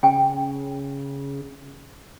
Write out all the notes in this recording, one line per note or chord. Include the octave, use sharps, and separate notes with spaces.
C#3 G5 G#5